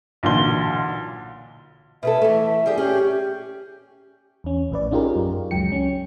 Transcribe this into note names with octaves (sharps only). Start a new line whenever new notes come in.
B1 A#2 D3 E3 C6 G7
B2 G#4 A4 E5
E3 A3
G3 G4 G#4
C#4 G4 G#4
E2 C#4
A#1 A2 B4 D5
C#4 D#4 F4 G4 G#4 A#4
F#2
C#2 F#2 F#3 G#3 G5 C#7
C#4